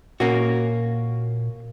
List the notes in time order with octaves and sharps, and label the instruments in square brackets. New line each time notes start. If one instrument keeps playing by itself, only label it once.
[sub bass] A#2 [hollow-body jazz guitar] A#3 C#4 F#4